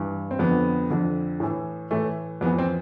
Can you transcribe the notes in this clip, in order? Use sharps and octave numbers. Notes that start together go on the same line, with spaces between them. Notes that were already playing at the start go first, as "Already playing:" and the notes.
Already playing: G2 E3
C4
F2 D3 B3
F2 D3
A2 E3
A2 E3 A3
F2 E3 B3
C4